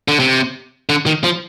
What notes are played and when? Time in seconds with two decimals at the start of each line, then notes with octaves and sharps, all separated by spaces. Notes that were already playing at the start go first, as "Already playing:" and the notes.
0.08 D3
0.20 C3
0.89 D3
1.06 D#3
1.24 F3